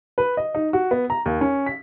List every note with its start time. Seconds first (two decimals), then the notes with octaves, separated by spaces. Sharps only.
0.18 B4
0.37 D#5
0.55 D#4
0.73 F#4
0.91 B3
1.10 A#5
1.26 D#2
1.41 C#4
1.66 B6